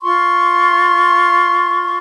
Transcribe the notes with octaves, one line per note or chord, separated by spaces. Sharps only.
F4 C6 C#6